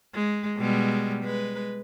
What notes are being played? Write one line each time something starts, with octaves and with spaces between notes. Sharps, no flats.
G#3
B2 G3 G#3
G#3 B4